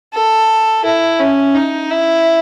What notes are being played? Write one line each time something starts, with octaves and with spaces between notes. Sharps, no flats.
A4
E4
C#4
D#4
E4